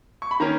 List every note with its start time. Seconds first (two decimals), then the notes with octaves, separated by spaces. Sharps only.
0.22 C#6
0.31 B5
0.40 D#3 A#3 C#4 A#5